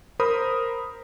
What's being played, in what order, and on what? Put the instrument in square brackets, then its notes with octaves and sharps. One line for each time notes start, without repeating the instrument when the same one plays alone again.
[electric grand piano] A#4 C5 B5 D#6